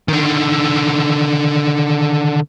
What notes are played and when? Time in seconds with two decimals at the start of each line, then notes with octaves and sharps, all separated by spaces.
0.08 D3 D#3